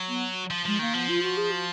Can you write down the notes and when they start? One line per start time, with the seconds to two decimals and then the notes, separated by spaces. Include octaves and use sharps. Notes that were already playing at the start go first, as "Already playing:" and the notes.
Already playing: F#3
0.08 B3
0.51 F3
0.65 F3 G#3
0.79 D#3 A#3
0.94 F3 B3
1.08 F4
1.22 F#4
1.37 G#4
1.51 F#4